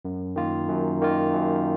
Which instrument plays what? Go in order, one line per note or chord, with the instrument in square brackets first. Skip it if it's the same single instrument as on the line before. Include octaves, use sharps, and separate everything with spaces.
[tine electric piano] F#2
D#3 A#3 F4
F#2
D#3 A#3 F4
F#2